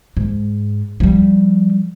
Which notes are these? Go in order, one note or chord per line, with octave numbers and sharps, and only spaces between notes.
G#2
F3 G3